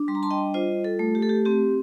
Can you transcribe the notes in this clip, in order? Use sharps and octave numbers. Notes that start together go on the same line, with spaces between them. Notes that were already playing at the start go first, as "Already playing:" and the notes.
Already playing: D4
G3 C6
A#5
A5 C6
D#5 G5
F4 C5 D#5
A4
A3
G4
A4
G4
C4 G4